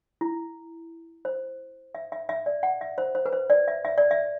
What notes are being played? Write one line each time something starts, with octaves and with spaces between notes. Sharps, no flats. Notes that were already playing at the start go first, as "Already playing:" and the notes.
E4
C5
E5
E5
E5
D5
F#5
E5
C5
C5
B4
C5
D5
E5
E5
D5
E5